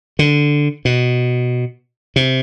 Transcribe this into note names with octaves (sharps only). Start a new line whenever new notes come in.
D3
B2
C3